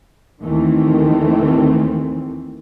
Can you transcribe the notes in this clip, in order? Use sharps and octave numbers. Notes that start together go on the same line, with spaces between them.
D#2 D#3 E3 A3 C4